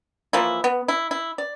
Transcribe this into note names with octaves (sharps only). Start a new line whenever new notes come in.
E3 F3 A#3 E4
B3
E4
E4
D5